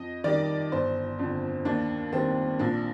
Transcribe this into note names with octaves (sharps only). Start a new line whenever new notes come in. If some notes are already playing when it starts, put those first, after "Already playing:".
Already playing: F2 D#5
D#3 G3 D5
G1 C5
F2 D3
D#2 D4
D#3 G3 C4
A#1 D4